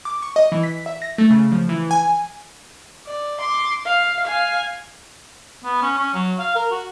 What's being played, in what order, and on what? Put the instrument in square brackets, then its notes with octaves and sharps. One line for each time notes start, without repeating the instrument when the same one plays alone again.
[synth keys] D6
C#6
D#5
E3
B6
E5
A#6
A3
C#3
F3
E3
G#5
[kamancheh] D5
C6 D6
F5
F5 G#5
[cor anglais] B3
C#4
C#4
F#3
F5
A#4
F#4